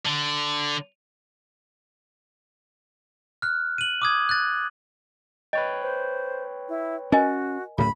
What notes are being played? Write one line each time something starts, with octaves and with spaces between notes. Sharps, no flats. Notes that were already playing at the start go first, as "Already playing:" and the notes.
D3
F6 F#6
D#7 F#7
D6 D#6 G#6
F#6 A6
B4 C#5 D#5 G5
C5
E4
C#4 F#4 A#4 D#5 G#5
D1 F#2 A2 B5